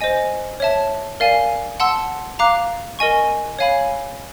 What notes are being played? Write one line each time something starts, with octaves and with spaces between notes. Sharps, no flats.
C5 D#5 G#5
C#5 E5 A5
A#4 D5 F5 G#5
F#5 A5 C6 E6
F5 A#5 D6 F#6
A#4 D#5 G#5 C#6
C#5 F5 G#5 B5